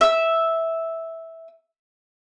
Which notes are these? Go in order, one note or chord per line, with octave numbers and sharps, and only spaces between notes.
E5 E6